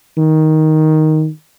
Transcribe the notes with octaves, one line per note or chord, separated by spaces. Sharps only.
D#3